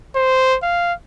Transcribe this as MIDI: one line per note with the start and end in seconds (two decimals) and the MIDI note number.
0.15 0.56 72
0.63 0.93 77